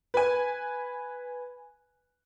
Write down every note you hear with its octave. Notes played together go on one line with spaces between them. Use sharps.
B4 G#5